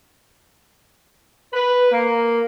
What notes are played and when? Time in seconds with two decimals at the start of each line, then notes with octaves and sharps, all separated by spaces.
1.54 B4
1.91 A#3